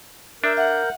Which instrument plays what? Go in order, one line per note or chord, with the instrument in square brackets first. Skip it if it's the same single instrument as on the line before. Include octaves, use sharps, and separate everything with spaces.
[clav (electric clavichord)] D4 [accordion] A#4 G6 [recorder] E5
[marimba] E5 [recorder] F#5